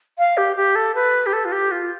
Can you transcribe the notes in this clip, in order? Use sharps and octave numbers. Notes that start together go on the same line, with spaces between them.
F5
G4
G4
A4
B4
G4
A4
F4
G4
F4